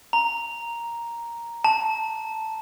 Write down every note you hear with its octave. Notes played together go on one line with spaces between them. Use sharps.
A#5
A5